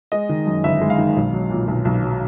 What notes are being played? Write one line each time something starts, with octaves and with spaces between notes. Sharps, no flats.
G#3 D#5
D#3
F#2
G1 E5
G#3
F5
D#3
B1
F#3
A#2
B1
B1
F#3